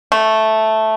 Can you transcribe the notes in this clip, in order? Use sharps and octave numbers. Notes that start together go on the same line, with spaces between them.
A3